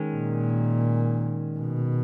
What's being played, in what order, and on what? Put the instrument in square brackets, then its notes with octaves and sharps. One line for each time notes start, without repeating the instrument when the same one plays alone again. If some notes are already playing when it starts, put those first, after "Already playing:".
Already playing: [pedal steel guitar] D#3 G#3 C#4
[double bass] A#2
B2